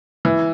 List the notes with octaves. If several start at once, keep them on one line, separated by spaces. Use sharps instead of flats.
E3